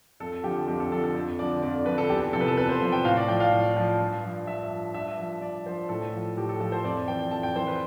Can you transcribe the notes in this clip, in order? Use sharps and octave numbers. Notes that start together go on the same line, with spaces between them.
F2 A4
D3 F3 G4
F2 G4
A4
D3 F3 A4
A4
F2
D3 F3 D5
F2 D5
D3 F3 B4
A4
E2 G4
C3 F3 A4
B4
A4
E2 B4
C5
C3 F3
G5
A2 F5
D5
F3 G5
F5
A2
F3
G2
F3
G2 E5
F3
G2 E5
F3
G2 D5
F3 C5
A2 A4
F3
A2 G4
A4
F3 A4
C5
F2 D5
E3 G5
F2 A5
G5
E3 C5
B4